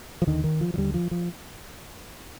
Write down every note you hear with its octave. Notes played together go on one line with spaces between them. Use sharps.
F3
D#2 D3 D#3
D#3
F3
F3
D#2 D3 G3
F3
F3